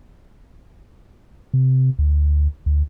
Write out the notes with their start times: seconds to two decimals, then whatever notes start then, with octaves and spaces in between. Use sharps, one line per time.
1.54 C3
1.99 D2
2.66 D2